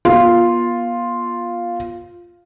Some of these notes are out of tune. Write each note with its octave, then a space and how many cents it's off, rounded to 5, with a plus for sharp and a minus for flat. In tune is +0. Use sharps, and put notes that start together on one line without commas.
B3 -40 F4 +0